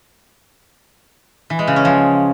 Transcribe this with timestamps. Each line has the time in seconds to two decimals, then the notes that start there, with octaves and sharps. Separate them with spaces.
1.50 E3
1.59 G#3
1.67 C#3
1.76 C#4
1.85 F3